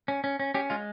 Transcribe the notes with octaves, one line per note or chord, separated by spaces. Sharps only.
C#4
C#4
C#4
C#4 G4
G#3 F4